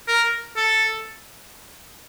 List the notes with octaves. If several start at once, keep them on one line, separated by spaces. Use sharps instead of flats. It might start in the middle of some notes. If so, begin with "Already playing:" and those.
A#4
A4